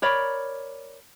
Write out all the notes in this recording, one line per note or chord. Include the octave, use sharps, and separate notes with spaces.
A#4 C#5 D5 B5